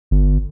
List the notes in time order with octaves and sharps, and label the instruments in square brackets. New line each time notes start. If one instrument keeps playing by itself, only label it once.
[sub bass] G1